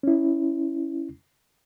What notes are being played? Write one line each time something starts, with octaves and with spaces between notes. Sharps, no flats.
C#4 E4